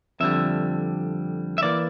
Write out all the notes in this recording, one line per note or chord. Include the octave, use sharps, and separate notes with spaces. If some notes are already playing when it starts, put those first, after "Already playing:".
F2 D3 G3 E5
E5
E3 A#3 D5